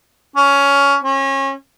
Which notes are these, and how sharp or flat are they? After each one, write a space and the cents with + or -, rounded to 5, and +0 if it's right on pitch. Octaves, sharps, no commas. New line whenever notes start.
C#4 +15
C#4 -30